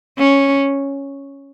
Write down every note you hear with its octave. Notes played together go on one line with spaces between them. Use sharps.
C#4